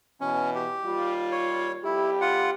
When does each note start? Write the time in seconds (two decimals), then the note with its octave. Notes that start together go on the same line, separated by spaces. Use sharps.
0.21 B2 E3 C#4
0.55 G4
0.85 D#2 G3 F4
1.32 C#5
1.84 F2 G3 E4 G4
2.21 F4 F#5